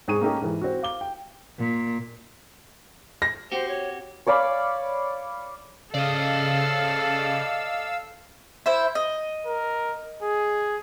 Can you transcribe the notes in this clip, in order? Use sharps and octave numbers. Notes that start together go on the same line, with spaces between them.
G#2 C4 G#4 C#6 D#7
A#3 C#4 D#4 G4 A4
G#2 E3
C4 F#4
F5 D6 G7
G5
A#2
A#6
C4 F#4 G4 C5
C#5
C#5 D5 F5 B5
C#3 A4 D5 D#5 F5 E6
E4 C5 E5
D#5
A#4
G#4